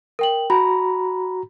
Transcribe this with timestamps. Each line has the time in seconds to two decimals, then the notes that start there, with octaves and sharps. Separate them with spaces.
0.19 A#4 G5 F#7
0.50 F#4 A#5 B5